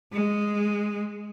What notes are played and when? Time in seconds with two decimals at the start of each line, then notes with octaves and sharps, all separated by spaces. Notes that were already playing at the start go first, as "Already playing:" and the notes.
0.13 G#3